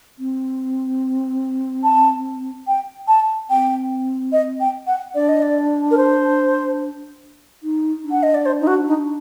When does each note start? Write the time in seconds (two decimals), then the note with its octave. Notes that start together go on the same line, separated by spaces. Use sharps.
0.19 C4
1.84 A5
2.67 G5
3.08 A5
3.50 C4 G5
4.32 D#5
4.60 G5
4.87 F#5
5.15 D4 D5
5.29 D#5
5.42 D5
5.91 A#4
5.97 C5
7.63 D#4
8.04 D4
8.11 F#5
8.23 D#5
8.34 D5
8.46 C5
8.61 D#4
8.67 F#4
8.87 D#4